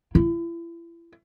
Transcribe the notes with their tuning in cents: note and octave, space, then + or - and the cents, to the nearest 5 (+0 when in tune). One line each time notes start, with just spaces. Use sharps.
E4 +35